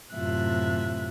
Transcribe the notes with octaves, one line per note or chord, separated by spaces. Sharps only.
F#2 A2 C3 F4 E5 F#6